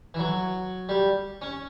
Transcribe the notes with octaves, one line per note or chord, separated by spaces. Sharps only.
E3
F#3
G3
C#4